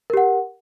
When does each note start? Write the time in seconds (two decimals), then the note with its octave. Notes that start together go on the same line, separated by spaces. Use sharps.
0.10 A#4
0.14 G4
0.17 F#5